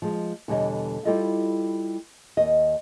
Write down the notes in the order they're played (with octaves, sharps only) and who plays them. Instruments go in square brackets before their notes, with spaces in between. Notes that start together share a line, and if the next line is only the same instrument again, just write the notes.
[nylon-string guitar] F3 G#3
E2 B2 D3 G3 C#5 D#5
G3 E4 F4 G4 A4 D#5
D#2 D#5